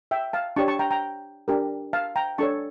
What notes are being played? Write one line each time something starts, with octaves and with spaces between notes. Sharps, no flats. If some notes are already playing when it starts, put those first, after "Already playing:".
E5 G5
F5 A5
D4 G4 C#5 A5 C#6
A5 C#6
G5 A#5
G5 A#5
D4 G4 A#4
F5 A5
G5 A#5
D4 A4 C#5 A5 C#6